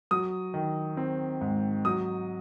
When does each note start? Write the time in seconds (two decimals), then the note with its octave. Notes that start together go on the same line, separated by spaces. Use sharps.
0.11 F#3 D#6
0.54 D#3
0.97 C4
1.41 G#2
1.85 F#3 D#6